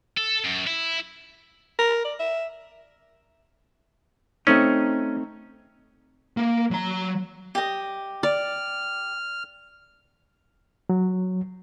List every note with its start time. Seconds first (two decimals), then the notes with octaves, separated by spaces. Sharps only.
0.18 A4
0.45 F#2
0.67 E4
1.79 A#4
2.05 D5
2.20 E5
4.47 A3 C4 C#4 D#4
6.37 A#3
6.71 F#3 A#5
7.55 G4 D#5
8.23 D5 F6
10.90 F#3